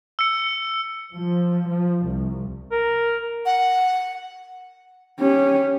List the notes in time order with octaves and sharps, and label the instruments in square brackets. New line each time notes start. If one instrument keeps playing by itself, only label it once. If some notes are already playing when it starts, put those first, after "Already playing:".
[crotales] E6 C#7
[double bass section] F3
F3
C2
[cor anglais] A#4
[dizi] F#5
[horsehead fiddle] C#4 G4